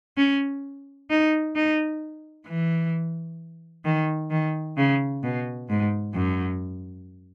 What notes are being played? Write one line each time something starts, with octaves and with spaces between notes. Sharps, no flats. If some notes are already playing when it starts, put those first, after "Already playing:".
C#4
D#4
D#4
E3
D#3
D#3
C#3
B2
G#2
F#2